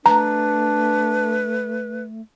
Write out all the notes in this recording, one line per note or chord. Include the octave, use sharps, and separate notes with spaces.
A3 D4 B4 A#5